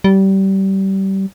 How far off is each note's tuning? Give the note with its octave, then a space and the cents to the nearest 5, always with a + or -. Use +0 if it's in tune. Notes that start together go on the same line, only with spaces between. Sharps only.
G3 -25